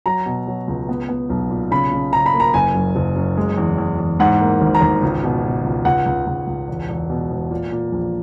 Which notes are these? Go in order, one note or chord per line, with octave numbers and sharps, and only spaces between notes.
F#3 A#5
B2
F#3
C#2
B3
B3
B1
A#2
C#3 B5
C#3
C#3 A#5
B5
A#3
A#5
F#1 G#5
F#2
F#1
F#2
G#3
E2
E2
E2
G#2 F#5
A#3
G#1
A#5
G#1
C#2
B2
B2
C#2
C#2 F#5
C#2
C#2
C#2
E1
E1
B2
E1
A#2
A#2
A#1